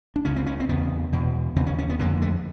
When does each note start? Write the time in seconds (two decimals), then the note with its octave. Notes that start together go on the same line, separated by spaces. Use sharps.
0.16 D4
0.25 C#2 C#3 C#4
0.36 C4
0.46 C#4
0.60 C4
0.69 E2 C#3 B3
1.12 E2 B2
1.56 D#2 C#3 C4
1.67 C#4
1.78 C#4
1.89 B3
1.99 F2 D3 A#3
2.22 A3